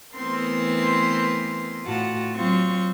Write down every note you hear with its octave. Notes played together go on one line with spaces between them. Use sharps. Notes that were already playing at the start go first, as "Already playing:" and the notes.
E3 A3 B3 C4 A#4 C6
A2 F4 F#4 F#5 A5
F#3 C4 F4 C#6